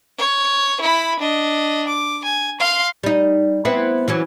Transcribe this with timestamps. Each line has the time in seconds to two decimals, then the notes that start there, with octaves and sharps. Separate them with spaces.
0.19 C#5
0.81 E4 B5
1.19 D4 D#5
1.87 D6
2.24 G#5
2.60 F5 C6
3.03 G3 D#4
3.65 B3 C4 E4
4.08 E3 F#3 C#4